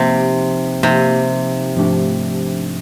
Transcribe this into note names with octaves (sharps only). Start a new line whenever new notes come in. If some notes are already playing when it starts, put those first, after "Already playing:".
Already playing: C3 F3 A#3 D#4 G4
C3 F3 A#3 D#4 G4
G#2 F3 A3 D4 G4